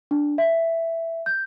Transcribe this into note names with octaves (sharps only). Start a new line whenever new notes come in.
D4
E5
G6